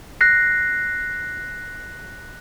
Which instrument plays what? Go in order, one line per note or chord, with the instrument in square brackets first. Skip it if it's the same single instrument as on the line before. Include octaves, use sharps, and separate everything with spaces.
[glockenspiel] F#6 A#6 C7